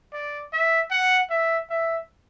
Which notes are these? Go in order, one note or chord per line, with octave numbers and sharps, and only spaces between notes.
D5
E5
F#5
E5
E5